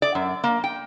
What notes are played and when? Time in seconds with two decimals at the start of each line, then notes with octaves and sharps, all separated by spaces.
0.02 D5
0.15 F#2
0.44 A#3
0.64 G5